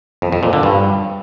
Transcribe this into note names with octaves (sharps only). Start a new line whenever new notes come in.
F2
F2
A#2
D3
G2